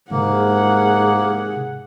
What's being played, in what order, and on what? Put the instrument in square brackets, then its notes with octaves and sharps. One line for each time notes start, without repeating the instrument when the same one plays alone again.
[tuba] G#2 [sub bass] C3 [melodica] A#3 [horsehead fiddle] G#4 F#5